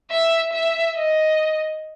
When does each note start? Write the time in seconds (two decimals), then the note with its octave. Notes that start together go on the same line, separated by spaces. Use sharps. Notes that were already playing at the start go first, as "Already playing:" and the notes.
0.10 E5
0.52 E5
0.96 D#5